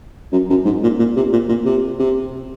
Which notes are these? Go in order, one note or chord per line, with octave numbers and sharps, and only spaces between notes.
F#2
F#2
G#2
A#2
A#2
C3
A#2
A#2
C3
C3